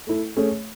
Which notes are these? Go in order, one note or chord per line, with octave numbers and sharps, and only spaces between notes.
A3 E4 A4
A3 C#4 G#4 C#5